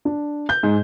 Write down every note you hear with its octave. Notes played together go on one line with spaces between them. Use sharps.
D4
G6
G#2